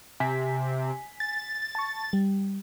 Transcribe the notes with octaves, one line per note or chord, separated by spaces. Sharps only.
C3 G#5 B6
A6
A5 C#6
G3